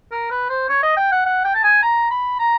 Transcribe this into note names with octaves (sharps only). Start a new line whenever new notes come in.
A#4
B4
C5
C#5
D#5
G5
F#5
F#5
G5
A5
G#5
A#5
B5
A#5